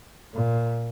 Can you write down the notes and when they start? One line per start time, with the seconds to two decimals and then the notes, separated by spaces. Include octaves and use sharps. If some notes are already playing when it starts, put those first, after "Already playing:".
0.34 A#2